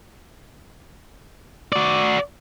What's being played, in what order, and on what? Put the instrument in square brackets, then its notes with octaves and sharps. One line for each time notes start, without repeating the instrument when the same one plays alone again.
[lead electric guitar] F#4 D5